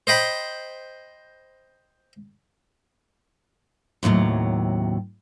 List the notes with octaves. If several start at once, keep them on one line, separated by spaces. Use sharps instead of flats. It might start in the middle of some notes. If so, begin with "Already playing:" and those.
C5 D#5 G5 B5
D#2 A2 C3 F#3